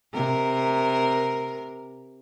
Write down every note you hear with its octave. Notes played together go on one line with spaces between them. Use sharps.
C3 A#4